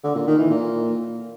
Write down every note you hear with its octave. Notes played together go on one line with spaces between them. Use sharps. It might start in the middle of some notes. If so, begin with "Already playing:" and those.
D3
A#2
D#3
E3
A#2